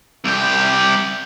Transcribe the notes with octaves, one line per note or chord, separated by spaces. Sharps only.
C2 G4